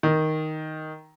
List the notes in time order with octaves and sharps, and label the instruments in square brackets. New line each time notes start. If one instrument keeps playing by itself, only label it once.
[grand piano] D#3